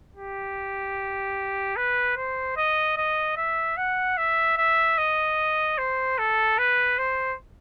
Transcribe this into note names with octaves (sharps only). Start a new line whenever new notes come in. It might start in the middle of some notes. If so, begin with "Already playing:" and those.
G4
B4
C5
D#5
D#5
E5
F#5
E5
E5
D#5
C5
A4
B4
C5